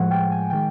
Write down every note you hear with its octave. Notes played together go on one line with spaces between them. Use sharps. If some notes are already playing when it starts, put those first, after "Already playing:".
Already playing: A2 F3 G#3 F#5
G5
G#5
D#3 G#3 G5